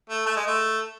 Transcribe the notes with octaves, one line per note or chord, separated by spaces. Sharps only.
A3
A3
G#3
A3